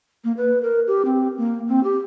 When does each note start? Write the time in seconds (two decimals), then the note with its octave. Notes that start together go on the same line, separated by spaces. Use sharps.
0.24 A#3
0.37 B4
0.62 A#4
0.87 G4
1.05 C4
1.38 A#3
1.68 C4
1.83 G4